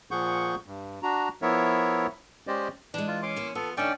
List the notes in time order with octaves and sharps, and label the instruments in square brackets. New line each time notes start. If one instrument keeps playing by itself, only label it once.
[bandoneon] A#2 F3 G#4 F#5 C#6 G6
G2
D4 F#4 A#5
F3 B3 E4 A#4 C#5 E5
G#3 C#4 G4 C5 D5 D#5
[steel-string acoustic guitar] E3 G#3 [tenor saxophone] D4
[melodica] F4
[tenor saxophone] C#4 [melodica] C6 D6
[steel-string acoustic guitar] A#3 E4
[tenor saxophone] B3 [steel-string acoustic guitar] F4 [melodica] A4
[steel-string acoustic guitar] D3 D#4 [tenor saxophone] A3 [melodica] C#4 D5 G5